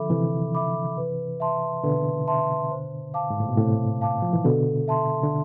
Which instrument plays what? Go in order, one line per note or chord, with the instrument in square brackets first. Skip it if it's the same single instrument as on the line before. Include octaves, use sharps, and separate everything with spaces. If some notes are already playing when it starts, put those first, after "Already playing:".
Already playing: [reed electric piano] D3 F3 [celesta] A4 E5 B5 D6
[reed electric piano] C3 E3 [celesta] A4
[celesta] E5 B5 D6
B4
E5 A5 C6
[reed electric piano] B2 D3 [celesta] B4
[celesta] E5 A5 C6
C5
F5 A5 D6
[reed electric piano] G#2
A2
B2
[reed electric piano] A2 C3 [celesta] C5
[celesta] F5 A5 D6
[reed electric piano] F3
E3
[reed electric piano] B2 D3 [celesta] A4
[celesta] E5 A5 C6
[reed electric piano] D3